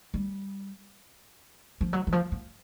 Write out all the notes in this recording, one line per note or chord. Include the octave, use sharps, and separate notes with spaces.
G3
F3
F#3
E3
F3
B3